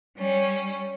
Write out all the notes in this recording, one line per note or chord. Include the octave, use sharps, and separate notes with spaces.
G3 C#4